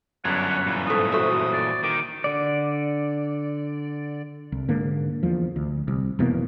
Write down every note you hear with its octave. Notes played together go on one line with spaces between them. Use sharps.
G1 F#2 D4 C#5 F#5
A#2 E3
G#2 A3 D#6
F#4 C5 E5
D5
D#3 D6
D3 D5
C2
G#2 D3 A#3
E2 F3
D2
C2
F1 B2 E3 A#3